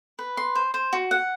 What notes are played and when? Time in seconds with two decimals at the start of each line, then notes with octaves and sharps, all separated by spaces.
0.19 B4
0.37 C6
0.55 C5
0.74 C5
0.93 F#4
1.11 F#5